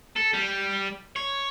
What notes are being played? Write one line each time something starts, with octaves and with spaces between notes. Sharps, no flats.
A4
G3
C#5